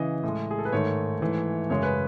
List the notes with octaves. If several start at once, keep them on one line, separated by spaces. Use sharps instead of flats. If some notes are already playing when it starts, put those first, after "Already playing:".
Already playing: C#3 E3 D#5
A2 G#3
G#4
A4
B4
G#2 D#3 A3 C#5
G#2 E3 A3
F#2 C#3 G#3 C#5
B4